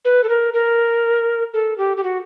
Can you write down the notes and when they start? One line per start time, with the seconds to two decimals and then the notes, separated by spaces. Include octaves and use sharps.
0.05 B4
0.24 A4
0.29 A#4
0.54 A#4
1.54 A4
1.78 G4
1.97 G4
2.04 F#4